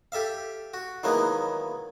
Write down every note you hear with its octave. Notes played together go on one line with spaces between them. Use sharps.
G4 A4 E5 F5
F#4
D#3 E3 F#3 G#3 A#3 B3